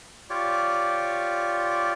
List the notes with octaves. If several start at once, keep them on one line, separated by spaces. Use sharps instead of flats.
F4 G4 C#5 D5